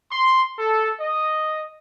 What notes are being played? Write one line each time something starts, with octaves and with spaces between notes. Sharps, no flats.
C6
A4
D#5